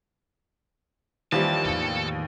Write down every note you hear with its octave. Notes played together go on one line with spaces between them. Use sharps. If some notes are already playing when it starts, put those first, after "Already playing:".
D#2 E3 F3 G3 A5
E2 A2 A4